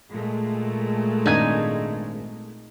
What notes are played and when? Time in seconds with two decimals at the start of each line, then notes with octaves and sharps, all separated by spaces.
0.10 A#2 G#3 A3
1.26 G#1 D4 D#4 G#5 G#6